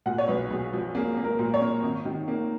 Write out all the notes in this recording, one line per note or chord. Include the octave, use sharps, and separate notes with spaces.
A#2 F#5
C#5
B1 B4
B1 G#4
F3
A#3 G#4
A#3
A#4
A#2
C#5
A#3
G#1
D#3
A#3